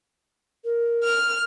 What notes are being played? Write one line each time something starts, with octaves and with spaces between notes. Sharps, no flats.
A#4
F6